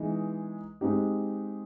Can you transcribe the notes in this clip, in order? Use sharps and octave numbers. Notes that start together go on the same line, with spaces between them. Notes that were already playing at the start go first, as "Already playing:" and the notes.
Already playing: E3 G#3 B3 D#4
G#3 C4 D#4 G4